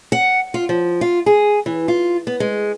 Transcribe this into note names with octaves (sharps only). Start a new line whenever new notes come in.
F#5
F4
F3
F4
G#4
E3
F4
B3
G#3